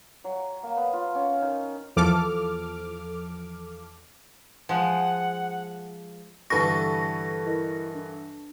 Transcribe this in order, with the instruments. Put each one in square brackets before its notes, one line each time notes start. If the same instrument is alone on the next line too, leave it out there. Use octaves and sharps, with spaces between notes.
[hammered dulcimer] F#3
A#3
B3
F4
C#4
D#3
[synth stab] E2 F3 A4 D6 F6
[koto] F3 G#3 [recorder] F#5
[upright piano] G2 D3 E3 [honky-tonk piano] A4 B4 C#6 [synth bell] A#6
[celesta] E4 A#4 D#5
D4